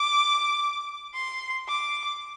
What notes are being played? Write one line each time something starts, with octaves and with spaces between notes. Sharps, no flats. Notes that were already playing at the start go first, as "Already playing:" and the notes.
Already playing: D6
C6
D6